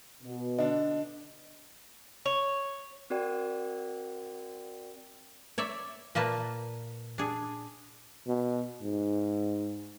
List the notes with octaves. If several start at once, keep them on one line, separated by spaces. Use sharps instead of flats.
B2
D3 D4 D#5
C#5
C4 F#4 A#4 D5 G5
C#5 D5 E5
A#2 A#3 B4 A5
D4 G#4
B2
G#2